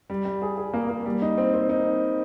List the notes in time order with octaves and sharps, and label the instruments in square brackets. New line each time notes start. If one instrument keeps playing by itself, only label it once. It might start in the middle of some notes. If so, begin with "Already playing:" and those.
[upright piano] G3
G3
G#4
G#4
A#3
A#3
G3
D#4
C4
C4
D#4